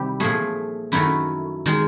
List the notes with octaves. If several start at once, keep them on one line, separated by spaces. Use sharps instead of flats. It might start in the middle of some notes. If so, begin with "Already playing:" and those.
Already playing: C3 D#3 G3 E4 G4
A#2 F3 A3 G#4
F#2 D#3 F#3 A3 E4
D#3 G#3